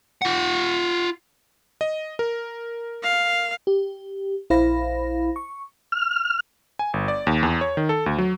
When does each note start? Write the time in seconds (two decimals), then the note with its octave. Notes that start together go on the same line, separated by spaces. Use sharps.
0.22 F4 F#5
1.81 D#5
2.19 A#4
3.03 F5
3.67 G4
4.50 A#1 E4 C5 F5 B5 A#6
5.36 C#6
5.92 F6
6.79 G#5
6.94 G1
7.08 D5
7.27 D#2
7.43 E2
7.61 C#5
7.77 D#3
7.89 A4
8.06 D2
8.18 F#3